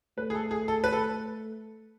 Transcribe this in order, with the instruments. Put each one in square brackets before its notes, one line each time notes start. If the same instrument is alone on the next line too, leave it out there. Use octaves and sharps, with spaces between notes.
[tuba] A3 [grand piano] B4
[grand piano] G#4
A4
G#4
A4
B4
A4